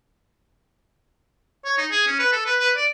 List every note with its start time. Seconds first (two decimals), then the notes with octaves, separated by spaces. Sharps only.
1.65 C#5
1.78 D#4
1.91 G#4
2.07 C#4
2.19 B4
2.32 A4
2.46 B4
2.60 B4
2.76 D5